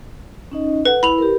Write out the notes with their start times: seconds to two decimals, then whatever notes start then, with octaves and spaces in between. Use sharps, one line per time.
0.51 C#4 D#4 D#5
0.85 A4 B4 F#5
1.03 E4 B5 F7
1.18 G4 A#4